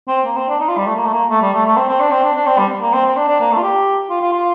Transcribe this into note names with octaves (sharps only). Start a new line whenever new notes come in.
C4
A#3
C4
D4
D#4
F4
G3
A3
A#3
A3
A#3
A3
G3
A3
A3
C4
C4
D4
C4
D4
D4
C4
G3
A#3
C4
C4
D4
D4
A#3
A3
F4
G4
F4
F4
F4